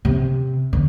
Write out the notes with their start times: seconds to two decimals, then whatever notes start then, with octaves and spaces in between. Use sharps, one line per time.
0.05 C3
0.73 D3